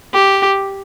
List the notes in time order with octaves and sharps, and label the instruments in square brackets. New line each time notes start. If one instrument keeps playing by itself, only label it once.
[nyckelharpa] G4